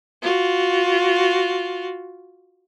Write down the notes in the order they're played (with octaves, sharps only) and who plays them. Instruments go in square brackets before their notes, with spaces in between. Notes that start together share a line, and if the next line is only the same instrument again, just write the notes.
[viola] F4 F#4